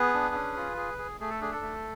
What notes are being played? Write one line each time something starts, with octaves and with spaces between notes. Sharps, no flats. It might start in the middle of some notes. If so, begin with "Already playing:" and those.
Already playing: B3 G#4 B4
D4
C#4
F4
G#4
G#4
A3 G#4
A4
D4 G#4
A4
A3